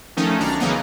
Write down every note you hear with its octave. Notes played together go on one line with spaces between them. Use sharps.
D#3 F3 A3 C#4 D#4
B1 D4 A#5
C#3 E3 F#3 A#3 B3 D#4